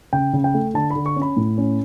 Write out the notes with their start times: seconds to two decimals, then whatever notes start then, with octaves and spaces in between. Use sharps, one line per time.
0.13 C#3 G5
0.33 C#3
0.44 G5
0.54 A3
0.74 D3 A5
0.90 B5
0.95 D3
1.06 C#6
1.16 C#4
1.22 B5
1.37 A2
1.58 C#4